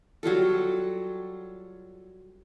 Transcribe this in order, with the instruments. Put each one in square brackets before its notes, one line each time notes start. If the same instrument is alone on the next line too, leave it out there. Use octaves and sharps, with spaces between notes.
[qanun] F#3 G3 F4 A4